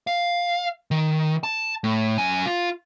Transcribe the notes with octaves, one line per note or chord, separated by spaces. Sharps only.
F5
D#3
A5
A2
F#2 G#5
F4